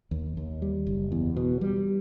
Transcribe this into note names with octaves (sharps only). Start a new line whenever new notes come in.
D#2
D#2
G3
F#1
E2
B2
G3